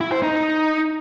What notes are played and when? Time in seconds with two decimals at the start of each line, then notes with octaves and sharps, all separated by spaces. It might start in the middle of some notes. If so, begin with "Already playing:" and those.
0.01 E4
0.12 C5
0.23 D#4